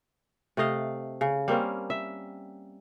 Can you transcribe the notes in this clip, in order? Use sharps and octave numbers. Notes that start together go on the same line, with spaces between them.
C3 A3 D#5 F5
C#3
G3 A#3 C4 C#4
E5